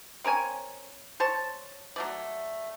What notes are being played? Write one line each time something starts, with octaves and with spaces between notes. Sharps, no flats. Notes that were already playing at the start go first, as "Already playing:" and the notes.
C4 A#4 C#5 G#5
C5 C#5 A5
F#3 A3 D5